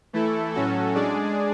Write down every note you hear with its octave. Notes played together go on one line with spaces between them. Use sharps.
E3 A3 E4 A4
A2 F#3 C#4 F#4 A4
G#3 D4 G#4 D5